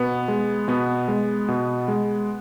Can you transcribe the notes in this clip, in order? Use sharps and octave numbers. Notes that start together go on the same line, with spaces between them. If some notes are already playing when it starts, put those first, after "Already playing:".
Already playing: B2 B3
G#3
B2 B3
G#3
B2
G#3